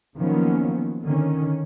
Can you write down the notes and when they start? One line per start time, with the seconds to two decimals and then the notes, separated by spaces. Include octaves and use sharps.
0.17 D#3 F3 F#3 A#3 B3 C#4
1.03 D3 D#3 C#4